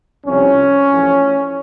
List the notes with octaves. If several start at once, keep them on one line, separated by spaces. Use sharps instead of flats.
C2 C3 F3 C#4
A1 A2 F3